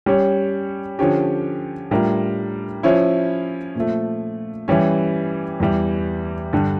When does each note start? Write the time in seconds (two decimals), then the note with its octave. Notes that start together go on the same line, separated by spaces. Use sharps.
0.06 G3 C#4 G4 C#5
0.99 D3 F3 C#4 G4
1.91 A2 G3 D4 F4 A#4
2.83 F3 C#4 E4
3.75 A#2 F3 A3
4.68 E3 G3 C#4
5.60 E2 E3 G3
6.53 G2 D3 G3